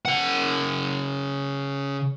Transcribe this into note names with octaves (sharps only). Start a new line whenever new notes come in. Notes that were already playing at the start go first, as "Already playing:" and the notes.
C#3 F#5